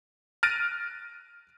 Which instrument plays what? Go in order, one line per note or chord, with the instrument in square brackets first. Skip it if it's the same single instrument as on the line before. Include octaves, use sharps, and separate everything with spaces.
[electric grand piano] F6 F#6 A6 A#6 D7 D#7